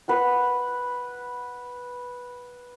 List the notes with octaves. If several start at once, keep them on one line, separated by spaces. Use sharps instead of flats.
B4 F#5 C6